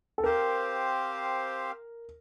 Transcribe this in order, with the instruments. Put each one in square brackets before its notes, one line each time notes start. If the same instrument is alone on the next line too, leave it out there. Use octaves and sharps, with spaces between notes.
[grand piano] A4
[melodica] C4 G4 C5 F5 [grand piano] A#4